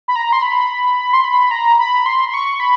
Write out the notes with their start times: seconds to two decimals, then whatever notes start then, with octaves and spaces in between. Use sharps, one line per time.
0.08 B5
0.16 A#5
0.33 C6
0.42 B5
1.13 C6
1.24 B5
1.51 A#5
1.79 B5
2.06 C6
2.29 C6
2.34 C#6
2.60 B5